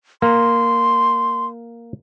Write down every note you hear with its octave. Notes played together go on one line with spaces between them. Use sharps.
A#3 C6